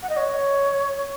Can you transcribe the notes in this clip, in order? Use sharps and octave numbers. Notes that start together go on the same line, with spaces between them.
F#5
D#5
C#5